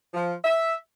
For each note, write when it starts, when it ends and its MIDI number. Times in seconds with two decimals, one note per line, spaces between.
0.14 0.33 53
0.44 0.74 76